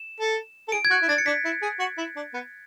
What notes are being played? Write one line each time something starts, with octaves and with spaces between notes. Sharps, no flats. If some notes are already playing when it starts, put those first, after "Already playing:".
Already playing: E7
A4
A4
G#4 D7
G#6
F#4 F#6
E4
D4 A6
C#7
D4 B6
E4
G#4
F#4
E4
D4
B3